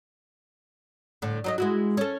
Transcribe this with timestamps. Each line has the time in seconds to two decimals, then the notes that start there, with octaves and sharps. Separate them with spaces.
1.22 A2 D3
1.44 F#3 D#4 D#5
1.58 G#3 E4 F#4
1.97 C#4 A4